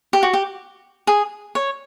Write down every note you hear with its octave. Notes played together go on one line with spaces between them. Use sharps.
G4
F#4
G4
G#4
C#5